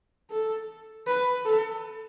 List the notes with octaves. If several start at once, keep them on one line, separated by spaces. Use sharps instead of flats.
A4
B4
A4